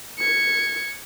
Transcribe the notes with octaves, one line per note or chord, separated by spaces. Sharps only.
G#6 C#7